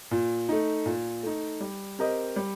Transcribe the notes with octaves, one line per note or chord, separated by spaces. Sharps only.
A#2
A3 D#4
A#2
A3 D#4
G3
C4 G4 A#4 D#5
G3